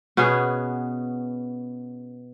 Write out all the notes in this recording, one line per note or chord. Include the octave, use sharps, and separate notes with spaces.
B2 B3 C#4 G#4